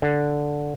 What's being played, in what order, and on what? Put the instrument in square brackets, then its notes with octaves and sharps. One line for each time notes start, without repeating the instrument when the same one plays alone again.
[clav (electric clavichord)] D3